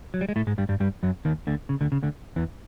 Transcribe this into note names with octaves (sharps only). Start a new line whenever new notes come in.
F#3
G3
G#3
A2 A3
G#2 G#3
G2 G3
G2 G3
G2 G3
F#2 F#3
D#2 D#3
D2 D3
C#3
D2 D3
C#3
D2 D3
E2 E3